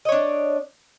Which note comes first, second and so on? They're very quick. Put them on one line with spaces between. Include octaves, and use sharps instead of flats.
D#5 C#5 D4